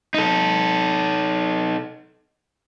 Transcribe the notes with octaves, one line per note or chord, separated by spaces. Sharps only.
D#4 A4